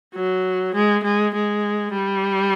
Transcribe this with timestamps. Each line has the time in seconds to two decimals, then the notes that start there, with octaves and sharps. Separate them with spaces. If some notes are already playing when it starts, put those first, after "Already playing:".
0.15 F#3
0.74 G#3
1.04 G#3
1.35 G#3
1.93 G3